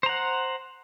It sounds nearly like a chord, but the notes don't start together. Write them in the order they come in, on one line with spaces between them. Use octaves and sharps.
C5 A#5 F#5